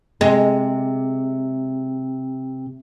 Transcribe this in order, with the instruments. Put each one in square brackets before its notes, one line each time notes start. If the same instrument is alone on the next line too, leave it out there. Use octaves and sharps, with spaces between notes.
[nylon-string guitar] C3 [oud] G#3